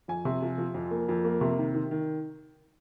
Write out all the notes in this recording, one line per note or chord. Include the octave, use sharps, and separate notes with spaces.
F2 G#5
C3
F3
F3
F2
A#3
F2
A#3
C3
D#3
D#3
D#3